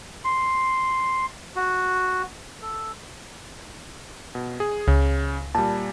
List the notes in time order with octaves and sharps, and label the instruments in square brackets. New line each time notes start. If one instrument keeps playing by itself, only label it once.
[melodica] C6
F#4
A4
[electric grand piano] B2
G#4
[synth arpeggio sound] C#2 [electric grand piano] C#3
[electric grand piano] A#2 G3 [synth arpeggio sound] A5